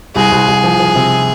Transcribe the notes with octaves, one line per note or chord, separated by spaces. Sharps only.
C2 G#4
C2
C2
F3
F3
C3